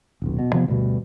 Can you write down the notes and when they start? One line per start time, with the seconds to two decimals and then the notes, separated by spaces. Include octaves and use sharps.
0.22 D#1 B1
0.39 B2
0.52 C3 F3 G#3 B3
0.68 D2 G2 B2